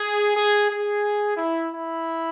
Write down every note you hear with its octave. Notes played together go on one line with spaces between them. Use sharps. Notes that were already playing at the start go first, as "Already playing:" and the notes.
Already playing: G#4
G#4
G#4
E4
E4